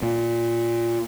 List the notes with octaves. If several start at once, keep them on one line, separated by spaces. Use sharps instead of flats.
A#2